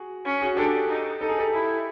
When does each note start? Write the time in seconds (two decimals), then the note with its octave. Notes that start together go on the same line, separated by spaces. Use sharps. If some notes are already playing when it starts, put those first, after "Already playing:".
Already playing: F#4 G#4
0.25 C#4
0.41 F#4 G#4
0.56 D4 G4 A4
0.88 D#4
1.20 D#4 A4
1.29 G#4
1.39 G4 A4
1.53 E4